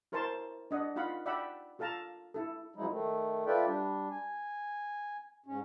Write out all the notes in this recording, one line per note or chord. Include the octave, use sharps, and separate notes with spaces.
E4 A#4 C5 C#5 A5 C6
D4 D#5 F#5
D#4 F4 F5 F#5 B5
D5 E5 F#5 G5 B5 E6
F4 A4 F5 A5 A#5
E4 A4
F#2 F3 F#3 G#3 D#4 E4
D#3 A3
F4 A4 B4 D5 E5 G5
G3 D4
G#5
G#2 C#4